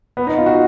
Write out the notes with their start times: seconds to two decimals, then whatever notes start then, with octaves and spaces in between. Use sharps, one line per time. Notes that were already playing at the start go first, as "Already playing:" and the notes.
0.17 B3
0.27 D#4
0.37 F4
0.46 F#4